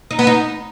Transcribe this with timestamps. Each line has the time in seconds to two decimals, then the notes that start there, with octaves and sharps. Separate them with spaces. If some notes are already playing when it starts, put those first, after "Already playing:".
0.11 D#4
0.19 B3
0.27 D#4